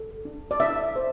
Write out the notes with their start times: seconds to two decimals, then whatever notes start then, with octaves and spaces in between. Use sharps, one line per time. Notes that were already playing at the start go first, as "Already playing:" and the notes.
Already playing: A4
0.25 D4
0.51 D5
0.60 D4 E5
0.96 C5